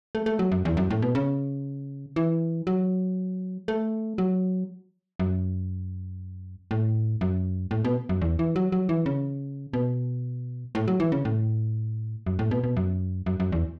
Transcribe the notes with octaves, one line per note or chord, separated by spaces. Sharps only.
A3
A3
F#3
F#2
E2
F#2
A2
B2
C#3
E3
F#3
A3
F#3
F#2
A2
F#2
A2
B2
F#2
E2
E3
F#3
F#3
E3
C#3
B2
A2
F#3
E3
C#3
A2
F#2
A2
B2
B2
F#2
F#2
F#2
E2